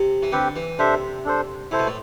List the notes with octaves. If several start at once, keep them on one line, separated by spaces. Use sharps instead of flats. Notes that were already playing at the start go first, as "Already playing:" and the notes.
Already playing: C3
E3
D3 C4 G4 B4
E3
C3 D4 A4 C5 E5
D4 A4 C5
C3 E4 A4 C5
B2
A2